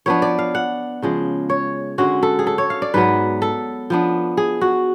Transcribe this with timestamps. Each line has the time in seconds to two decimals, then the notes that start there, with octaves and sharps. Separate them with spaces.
0.06 F3 B3 D4 C#5
0.22 D5
0.39 F5
0.55 F#5
1.02 C#3 F3 G#3
1.50 C#5
1.98 D3 G#3 C#4 F#4
2.23 A4
2.39 G#4
2.47 A4
2.58 C#5
2.70 F5
2.82 D5
2.94 G#2 F#3 B3 B4
3.42 A4
3.90 F3 B3 D4
4.37 G#4
4.61 F#4